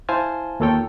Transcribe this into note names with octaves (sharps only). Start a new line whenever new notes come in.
E4 C5 F5 G#5 A5
D#2 A#3 F4 A4 C#5 G5